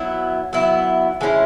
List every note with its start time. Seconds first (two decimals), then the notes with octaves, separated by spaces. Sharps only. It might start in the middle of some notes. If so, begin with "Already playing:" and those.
Already playing: F#3 B3 E4
0.53 F#3 B3 E4
1.21 E3 G#3 C#4 E4